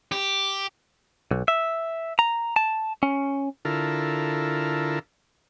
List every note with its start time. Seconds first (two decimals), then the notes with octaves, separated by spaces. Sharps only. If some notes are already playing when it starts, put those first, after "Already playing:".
0.12 G4
1.31 B1
1.48 E5
2.19 A#5
2.56 A5
3.03 C#4
3.65 D3 E4 F4 A4 A#4